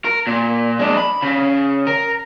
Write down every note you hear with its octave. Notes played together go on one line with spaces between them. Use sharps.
A#4
A#2
G#3 D4
B5
C#3
A#4